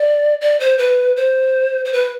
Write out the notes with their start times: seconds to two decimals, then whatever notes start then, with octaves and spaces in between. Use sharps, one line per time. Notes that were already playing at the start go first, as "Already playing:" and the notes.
Already playing: D5
0.41 D5
0.60 C5
0.79 B4
1.17 C5
1.85 C5
1.93 B4